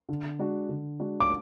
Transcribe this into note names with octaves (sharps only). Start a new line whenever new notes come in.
D3
G#3 D4 F#4
D3
G#3 D4 F#4
D6